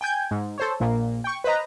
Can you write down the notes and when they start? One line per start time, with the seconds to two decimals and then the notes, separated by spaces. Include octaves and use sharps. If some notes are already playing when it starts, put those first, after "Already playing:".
0.01 G5 G#5 G6 G#6
0.31 G#2
0.58 A4 C5 C#5
0.80 A#1 A#2 A#3
1.24 G5 C#6
1.44 B4 C5 D#5 A#5